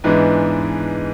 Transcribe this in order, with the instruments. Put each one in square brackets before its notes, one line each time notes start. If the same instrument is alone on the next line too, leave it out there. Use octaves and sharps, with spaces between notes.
[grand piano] G#2 E3 G#3 B3 D4